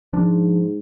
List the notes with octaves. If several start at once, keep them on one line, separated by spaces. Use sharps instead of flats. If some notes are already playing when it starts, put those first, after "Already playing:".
G#2 F3 D4